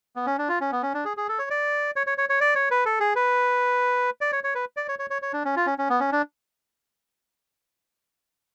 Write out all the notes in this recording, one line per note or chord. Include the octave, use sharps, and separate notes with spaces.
B3
C#4
D4
F4
C#4
B3
C#4
D4
G#4
G#4
A4
C#5
D5
C#5
C#5
C#5
C#5
D5
C#5
B4
A4
G#4
B4
D5
C#5
C#5
B4
D5
C#5
C#5
C#5
C#5
D4
C#4
F4
C#4
C#4
B3
C#4
D4